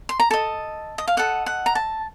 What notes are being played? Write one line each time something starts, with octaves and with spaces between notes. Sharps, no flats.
C6
A#5
A4 D#5 A5
D#5
F5
A4 D#5 F#5
F#5
A#5
A5